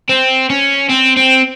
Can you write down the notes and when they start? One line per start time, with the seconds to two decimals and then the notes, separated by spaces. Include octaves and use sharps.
0.09 C4
0.50 C#4
0.89 C4
1.17 C4